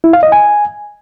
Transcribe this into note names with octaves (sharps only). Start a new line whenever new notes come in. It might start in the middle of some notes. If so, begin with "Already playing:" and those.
E4
F5
D#5
G#5